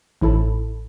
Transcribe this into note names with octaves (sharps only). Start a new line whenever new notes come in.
A1 A2 E4 A4 A5 B5